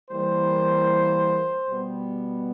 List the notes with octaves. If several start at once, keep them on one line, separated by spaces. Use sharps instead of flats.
E3 G3 A#3 C5
B2 G3 B3